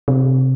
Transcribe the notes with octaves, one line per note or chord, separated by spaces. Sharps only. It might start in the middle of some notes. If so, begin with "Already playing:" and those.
C3